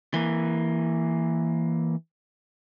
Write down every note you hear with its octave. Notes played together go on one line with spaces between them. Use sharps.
E3 A#3